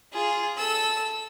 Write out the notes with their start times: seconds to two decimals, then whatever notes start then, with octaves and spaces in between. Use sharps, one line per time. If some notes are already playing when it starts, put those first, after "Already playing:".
0.13 F4 G#4
0.57 A4 E6